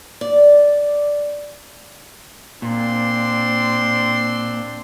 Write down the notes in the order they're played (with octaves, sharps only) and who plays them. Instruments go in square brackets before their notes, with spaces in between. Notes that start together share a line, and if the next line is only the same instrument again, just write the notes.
[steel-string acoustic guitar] D5
[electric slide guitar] A#2 [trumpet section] C4 D4 C6